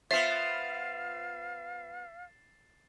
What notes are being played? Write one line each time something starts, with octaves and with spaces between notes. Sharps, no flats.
B3 F4 C5 E5 F5 A6 C7 E7